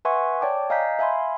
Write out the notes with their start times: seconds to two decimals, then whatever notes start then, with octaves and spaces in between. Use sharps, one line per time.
0.05 B4 E5 F#5 G#5 C6 C#6
0.41 C#5 D5 G5 A5 D6
0.70 D#5 F5 G#5 A#5 G6 B6
0.99 E5 F5 G#5 B5 C6